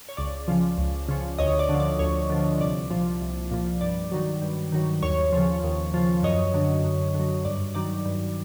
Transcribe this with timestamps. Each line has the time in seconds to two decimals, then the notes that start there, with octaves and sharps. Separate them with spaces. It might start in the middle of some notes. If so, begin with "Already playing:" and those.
0.09 C#5
0.17 C#2 D5
0.48 C#3 F3
0.78 C#2
1.08 C#3 F3
1.38 D2 C#5 D#5
1.59 D5
1.69 D3
1.74 F3
1.80 D5
1.99 D2 C#5
2.30 D3 F3
2.60 C2 D5
2.91 A#2 F3
3.21 C2
3.51 A#2 F3
3.81 G2 D5
4.12 D#3 F#3
4.42 G2
4.72 D#3 F#3
5.02 D#2 C#5
5.32 C#3 F3
5.64 D#2
5.94 C#3 F3
6.23 F#2 C#5 D#5
6.54 D3 F#3
6.84 F#2
7.14 D3 F#3
7.45 G2 D5
7.75 D#3 F#3 D5
8.05 G2